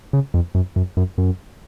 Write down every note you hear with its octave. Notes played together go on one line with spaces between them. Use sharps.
C#3
F2
F#2
F#2
F#2
F#2